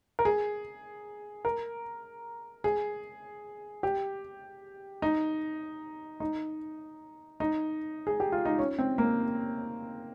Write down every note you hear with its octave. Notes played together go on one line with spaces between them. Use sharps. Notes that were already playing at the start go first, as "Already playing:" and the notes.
A#4
G#4
A#4
G#4
G4
D#4
D#4
D#4
G#4
G4
F4
D#4
C#4
C4
A#3